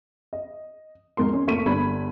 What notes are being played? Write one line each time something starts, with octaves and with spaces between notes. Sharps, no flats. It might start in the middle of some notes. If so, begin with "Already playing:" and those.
D#5
F2 G#2 A#4 C6
C#4
F1 A3 A#3 C#6 B6 D#7
G1 G3 D4 B5 G#6